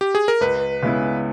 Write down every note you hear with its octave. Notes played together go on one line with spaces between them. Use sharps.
G4
G#4
A#4
C#2 B4
C#3 G#3 B3 E4